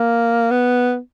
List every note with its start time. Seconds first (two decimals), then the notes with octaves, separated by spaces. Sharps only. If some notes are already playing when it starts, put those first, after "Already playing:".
Already playing: A#3
0.51 B3